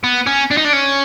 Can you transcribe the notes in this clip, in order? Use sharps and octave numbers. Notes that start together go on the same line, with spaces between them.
B3
C#4
D4
D#4
D4
C#4